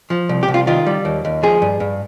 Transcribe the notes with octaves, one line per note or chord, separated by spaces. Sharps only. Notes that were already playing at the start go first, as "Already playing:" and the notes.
F3
C2
G4
C2
F4
D#3 F4
G3
D#2
D#2
F3 G#4
G2
G2